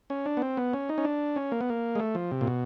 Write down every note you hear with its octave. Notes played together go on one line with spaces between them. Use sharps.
C#4
D4
B3
C4
B3
C#4
D#4
C#4
D4
C#4
A#3
B3
A#3
G#3
A3
F3
C3
A#2
B2